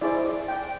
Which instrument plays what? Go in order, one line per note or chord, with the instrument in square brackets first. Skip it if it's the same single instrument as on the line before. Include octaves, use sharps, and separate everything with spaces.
[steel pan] E4 G#4 C5 D5
D5
G5